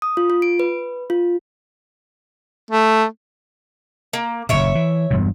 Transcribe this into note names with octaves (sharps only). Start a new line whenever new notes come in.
D#6
F4
F4
D7
B4
F4
A3
A#3
F#1 A#2 C#5 E5
E3
E1 G2 B2